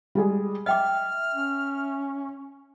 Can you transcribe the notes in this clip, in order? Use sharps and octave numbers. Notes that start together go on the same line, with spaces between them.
G3 G#3 G#4
D#5 E5 G5 D6 F6
C#4